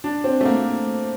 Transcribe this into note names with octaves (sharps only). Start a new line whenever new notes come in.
D4
C4
A3
A#3